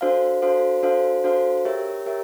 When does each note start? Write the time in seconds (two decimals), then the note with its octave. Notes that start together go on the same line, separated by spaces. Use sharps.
0.01 D4 F#4 A4 C5 F5
0.42 D4 F#4 A4 C5 F5
0.83 D4 F#4 A4 C5 F5
1.24 D4 F#4 A4 C5 F5
1.65 G4 A#4 C#5 E5
2.06 G4 A#4 C#5 E5